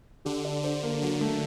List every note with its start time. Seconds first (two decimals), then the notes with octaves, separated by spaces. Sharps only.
0.25 D3 G4
0.45 D4
0.63 D3 C5
0.83 A#3
1.02 D3 F#3
1.21 A3